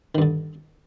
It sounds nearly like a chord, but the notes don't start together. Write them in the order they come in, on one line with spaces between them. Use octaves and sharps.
D#3 G2 D3